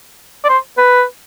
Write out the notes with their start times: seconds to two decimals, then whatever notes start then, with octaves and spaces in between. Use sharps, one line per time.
0.44 D5
0.49 C5
0.78 B4